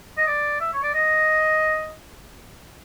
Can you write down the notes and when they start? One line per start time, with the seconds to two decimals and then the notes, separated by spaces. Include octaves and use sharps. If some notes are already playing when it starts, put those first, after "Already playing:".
0.18 D#5
0.27 D5
0.60 E5
0.73 C#5
0.83 D5
0.94 D#5